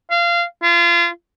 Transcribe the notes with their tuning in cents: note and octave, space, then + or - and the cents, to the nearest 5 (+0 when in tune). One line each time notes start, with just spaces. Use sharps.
F5 -20
F4 -30